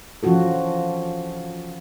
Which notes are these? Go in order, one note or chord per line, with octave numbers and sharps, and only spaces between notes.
E3 F3 C#4 F4 F#4 A4